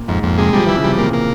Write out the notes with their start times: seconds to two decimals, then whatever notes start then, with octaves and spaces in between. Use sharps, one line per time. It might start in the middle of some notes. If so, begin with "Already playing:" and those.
Already playing: A#2
0.08 F2 G#2
0.23 F2 A#2
0.38 C3 G#3
0.53 F3 G3
0.66 E3 E4
0.77 C#3
0.84 C3 G3
0.98 A#2 A#3
1.13 A#3